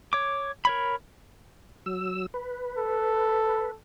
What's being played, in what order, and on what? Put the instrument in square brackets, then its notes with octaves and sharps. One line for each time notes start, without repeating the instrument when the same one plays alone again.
[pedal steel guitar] C#5 D6
A#4 C#5 B5
[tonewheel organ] F#3 E6
B4
[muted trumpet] A4